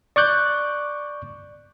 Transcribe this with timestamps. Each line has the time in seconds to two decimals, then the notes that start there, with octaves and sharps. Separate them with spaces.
0.16 D5 C#6 D6 F#6 G6